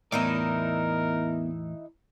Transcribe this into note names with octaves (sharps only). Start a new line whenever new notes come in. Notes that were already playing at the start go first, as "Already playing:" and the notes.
E2 A2 E3 B3 D#4 E4 A#4 D5